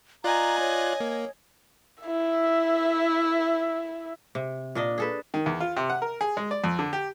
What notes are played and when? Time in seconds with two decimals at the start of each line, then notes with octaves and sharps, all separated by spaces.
0.24 F4 D5 D#5 G#5 A#5 F#6
0.59 C#5
1.00 A#3
2.03 E4 E5
4.35 C3
4.75 A#2 D4 D#5
4.98 G#4 A4 B4
5.34 D#3
5.46 E2
5.60 F4
5.77 C3
5.90 F#5
6.02 A#4
6.21 G#4
6.37 G#3
6.51 D5
6.64 F2
6.79 D3
6.93 G4